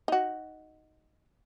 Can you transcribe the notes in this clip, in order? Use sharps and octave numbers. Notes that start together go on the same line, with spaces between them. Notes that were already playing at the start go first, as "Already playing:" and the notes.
D#4 F#4